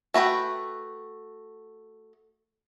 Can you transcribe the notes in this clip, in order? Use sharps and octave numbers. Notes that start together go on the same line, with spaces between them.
A3 F#4 B4 G5